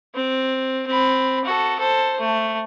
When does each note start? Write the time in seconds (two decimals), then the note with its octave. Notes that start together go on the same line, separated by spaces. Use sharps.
0.15 C4
0.86 C4 B5
1.44 F#4 A4
1.79 A4 C5
2.20 A3